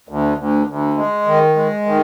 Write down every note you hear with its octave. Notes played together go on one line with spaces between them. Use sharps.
D2
D2
D2
G#3
D#3
G#3
D#3